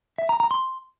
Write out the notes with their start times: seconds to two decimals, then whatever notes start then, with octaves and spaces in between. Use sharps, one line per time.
0.18 E5
0.29 A#5
0.40 A#5
0.51 C6